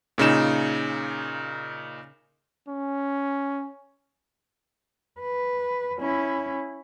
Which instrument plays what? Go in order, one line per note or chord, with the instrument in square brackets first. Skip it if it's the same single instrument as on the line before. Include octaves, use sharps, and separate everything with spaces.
[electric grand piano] A#2 C#3 D#4 E7
[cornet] C#4
[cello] B4
C#4 E4